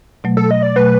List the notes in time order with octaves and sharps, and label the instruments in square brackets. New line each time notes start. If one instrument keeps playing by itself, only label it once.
[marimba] B2 F#3 A3
[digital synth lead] A4
D#5
D5
[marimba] B2 F#3 A3 [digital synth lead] B4